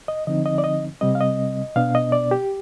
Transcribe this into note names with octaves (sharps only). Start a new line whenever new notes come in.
D#5
D3 F3 C4 D#4 D#5
D#5
D5
D#5
C3 G3 C4 D#5
F5
D#5
B2 B3 D4 F5
D#5
D5
G4